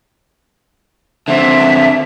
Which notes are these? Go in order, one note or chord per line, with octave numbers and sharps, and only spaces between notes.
D3 C4 E5